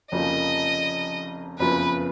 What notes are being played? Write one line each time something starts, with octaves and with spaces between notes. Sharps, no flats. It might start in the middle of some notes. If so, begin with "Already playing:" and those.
F1 F2 C#3 F3 A#3 D#5
F#1 F2 C#3 F3 B3 B4